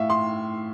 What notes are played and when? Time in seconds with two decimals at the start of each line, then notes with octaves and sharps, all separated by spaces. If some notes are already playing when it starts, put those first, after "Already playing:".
Already playing: A2 E5 F5
0.10 C6